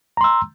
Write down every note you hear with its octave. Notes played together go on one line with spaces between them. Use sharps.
A#5 C6 E6